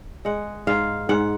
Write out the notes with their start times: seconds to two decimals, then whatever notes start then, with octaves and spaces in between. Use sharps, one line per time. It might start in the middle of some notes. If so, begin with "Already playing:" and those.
0.25 G#3 F#5
0.67 G#2 F5
1.09 G#2 F#5